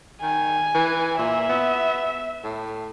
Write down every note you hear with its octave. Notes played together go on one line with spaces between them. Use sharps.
D#3 G#5
E3
A#2 E5
B3
A2